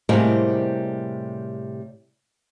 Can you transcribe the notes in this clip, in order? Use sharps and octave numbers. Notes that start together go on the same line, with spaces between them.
A2 C3 G3 G#3 A#3 C4